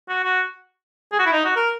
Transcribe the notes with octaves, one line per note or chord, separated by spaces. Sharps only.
F#4
F#4
G#4
F#4
E4
D#4
F#4
A#4